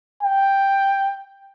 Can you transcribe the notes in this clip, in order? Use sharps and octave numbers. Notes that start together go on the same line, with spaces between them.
G5